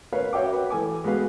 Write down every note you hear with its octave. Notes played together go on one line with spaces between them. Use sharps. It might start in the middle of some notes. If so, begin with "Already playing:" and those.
A#4 B4 C#5 F5
F#4 C#5 E5 G5 D6
B4
E3 A4 G#5 D6
G#3 B3 F#4 B4 F5